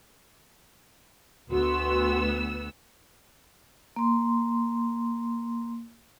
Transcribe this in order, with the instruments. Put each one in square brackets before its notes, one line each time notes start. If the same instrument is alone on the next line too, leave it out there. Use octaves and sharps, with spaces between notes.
[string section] D2 B3 E6 [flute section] F#4 C6
[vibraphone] A#3 C6